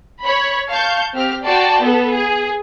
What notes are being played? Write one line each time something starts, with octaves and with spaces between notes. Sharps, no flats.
C#5 B5
F5 A5 C#6 G6
C4 G4 F6
F#4 D5 G5 A5 C6
B3 A4
G#4